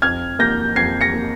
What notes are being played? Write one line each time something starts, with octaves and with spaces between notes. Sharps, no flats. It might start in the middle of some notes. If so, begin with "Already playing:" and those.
F2 F6 G#6
A#3 G6 A#6
F2 G#6 C7
A#6 C#7
A#3